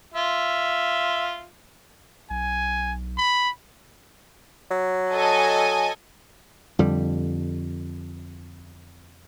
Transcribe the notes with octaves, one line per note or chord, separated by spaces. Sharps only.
F4 E5
B1 G#5
B5
F#3
A4 D#5 G#5
F2 D3 G3